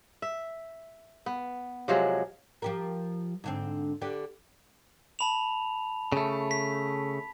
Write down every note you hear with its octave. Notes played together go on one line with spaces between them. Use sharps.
E5
B3
C3 F3 F#3 G#3
F3 G4 A#4
G#2 D3 C4
D3 G4 B4
A5 B5 F7
C#3 A3
B6